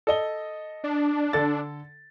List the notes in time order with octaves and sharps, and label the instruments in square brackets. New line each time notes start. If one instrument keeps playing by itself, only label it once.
[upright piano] A4 D#5 G7
[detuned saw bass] D4
[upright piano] D3 A4 A6